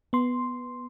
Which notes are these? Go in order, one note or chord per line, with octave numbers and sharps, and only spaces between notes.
B3 C6